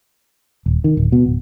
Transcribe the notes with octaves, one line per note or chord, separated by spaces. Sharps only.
D#1
D#3
D1
B2
D1